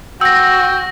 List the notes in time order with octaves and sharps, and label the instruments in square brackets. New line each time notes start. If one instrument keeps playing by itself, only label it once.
[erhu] F#4 [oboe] G5 [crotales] E6 A#6